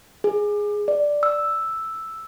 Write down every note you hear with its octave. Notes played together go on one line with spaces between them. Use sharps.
G#4
D5
E6